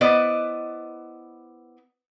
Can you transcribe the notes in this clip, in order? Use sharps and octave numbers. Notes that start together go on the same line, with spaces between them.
B3 E4 B4 C5 D5 D#5